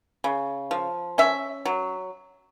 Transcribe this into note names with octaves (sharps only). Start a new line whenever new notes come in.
C#3
F3
C#4 E5
F#3